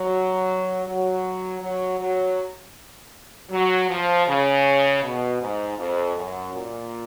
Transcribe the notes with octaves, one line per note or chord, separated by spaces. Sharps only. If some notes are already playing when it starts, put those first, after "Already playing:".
Already playing: F#3
F#3
F#3
F#3
F#3
F3
C#3
B2
G#2
F2
F#2
A#2